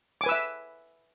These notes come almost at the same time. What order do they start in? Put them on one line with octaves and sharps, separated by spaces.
D6 G#5 B4 E6 E5